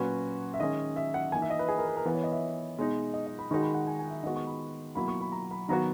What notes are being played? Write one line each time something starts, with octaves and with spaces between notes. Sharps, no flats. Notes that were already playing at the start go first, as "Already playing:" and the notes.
Already playing: A#2 F#3 C#4 F#4 B4
E5
D#3 G#3 C#4 D#5
E5
F#5
E3 A#3 D#4 G#5
E5
D#5
B4
G#4
A#4
B4
A#4
E3 B3 E4 B4
C#5
D#5
E5
B2 G#3 D#4
D#5
D#5
B5
D#3 G#3 D#4 F#4 C#6
B5
F#5
G#5
G#5
E5
D#3 G#3 B3 F#4 D#5
C#6
B5
B2 F#3 A#3 E4 B5
C#6
B5
A#5
B5
D#3 F#3 B3 F#4 A#5